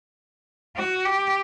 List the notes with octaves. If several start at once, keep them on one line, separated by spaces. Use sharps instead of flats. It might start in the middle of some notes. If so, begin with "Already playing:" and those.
F#4
G4